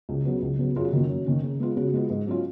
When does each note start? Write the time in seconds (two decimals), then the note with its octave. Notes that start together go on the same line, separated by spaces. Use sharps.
0.09 C#2
0.25 C#3 F#3 B3
0.42 C#2
0.59 C#3 F#3 B3
0.76 F#2 F4 G#4
0.84 F#4
0.93 D#3 A#3 C#4 F4
1.10 F#2
1.26 D#3 A#3 C#4
1.43 C#3
1.60 G#3 B3 F4
1.77 C#3 F#4
1.94 G#3 B3 F4
2.10 G#2
2.27 F#3 C#4 F4